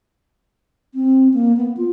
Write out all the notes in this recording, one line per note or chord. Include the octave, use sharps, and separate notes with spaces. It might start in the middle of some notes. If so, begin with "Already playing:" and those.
C4
A#3
B3
F4